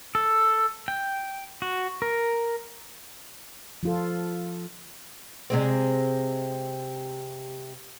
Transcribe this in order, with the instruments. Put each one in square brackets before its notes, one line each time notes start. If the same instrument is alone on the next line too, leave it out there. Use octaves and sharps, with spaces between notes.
[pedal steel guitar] A4
G5
F#4
A#4
[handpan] F3 F4 A4
[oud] C3 G#3 C4